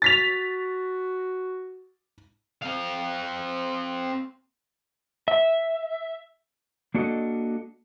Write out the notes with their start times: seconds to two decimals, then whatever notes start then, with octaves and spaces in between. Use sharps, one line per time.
0.02 F#4 A6 B6 F7
2.62 C4 F5
5.28 E5
6.94 A#3 D4 F#4 A4 B4 D#5